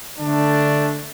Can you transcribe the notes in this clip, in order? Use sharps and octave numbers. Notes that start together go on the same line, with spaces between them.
D3 A3 D4